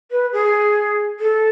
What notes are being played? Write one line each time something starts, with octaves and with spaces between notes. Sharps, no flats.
B4
G#4
A4